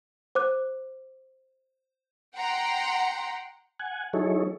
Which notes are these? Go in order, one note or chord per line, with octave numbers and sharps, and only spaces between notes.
C5 D6 F#6
F#5 G5 A#5 C6
F#5 G#5
F#3 D#4 E4 G#4 A4 C#5